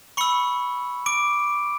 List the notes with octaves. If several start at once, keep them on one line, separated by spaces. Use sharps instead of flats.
B5 C#6 E6 C#7
D6 D7